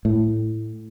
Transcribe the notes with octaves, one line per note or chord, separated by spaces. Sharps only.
A2